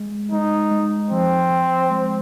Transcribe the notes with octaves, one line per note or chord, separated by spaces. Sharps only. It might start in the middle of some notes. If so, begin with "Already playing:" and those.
Already playing: G#3
G#3 D#4
G#3
F3 C4
F3
G#3